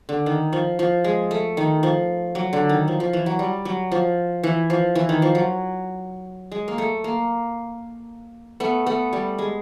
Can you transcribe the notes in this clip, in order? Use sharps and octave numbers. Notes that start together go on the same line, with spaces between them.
D3
D#3
F3
F3
G#3
A3
D#3
F3
F#3
D3
D#3
F3
F3
E3
F#3
G3
F#3
F3
E3
F3
E3
D#3
F3
F#3
G#3
A#3
A3
A#3
A3 B3
A3 B3
G3
G#3